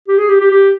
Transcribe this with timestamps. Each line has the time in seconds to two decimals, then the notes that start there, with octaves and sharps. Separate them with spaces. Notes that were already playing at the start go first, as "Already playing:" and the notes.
0.08 G4
0.18 G#4
0.29 G4
0.40 G4
0.51 G4